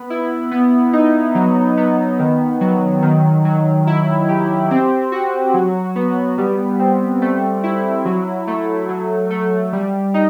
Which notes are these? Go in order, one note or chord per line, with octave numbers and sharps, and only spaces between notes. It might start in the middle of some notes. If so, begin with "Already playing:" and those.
Already playing: B3
E4
B3
D#4
F#3
B3
D#3
F#3
D#3
F#3
E4
G4
C4
F#4
F#3
B3
G3
C4
A3
E4
F#3
A3
F#3
A3
G3
D#4